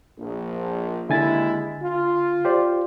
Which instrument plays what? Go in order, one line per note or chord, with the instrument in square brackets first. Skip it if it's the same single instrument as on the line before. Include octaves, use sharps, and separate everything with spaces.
[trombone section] A#1
[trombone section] D#2 G#3 E4 [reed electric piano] D3 G#5 A6
[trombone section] F4
[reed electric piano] G4 C5 D5